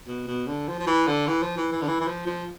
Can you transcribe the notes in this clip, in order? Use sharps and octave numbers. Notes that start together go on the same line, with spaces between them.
B2
B2
D3
F3
F3
E3
D3
E3
F3
E3
E3
D3
E3
E3
F3
F3